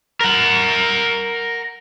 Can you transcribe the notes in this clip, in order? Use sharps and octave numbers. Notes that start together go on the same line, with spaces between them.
A#4 F#5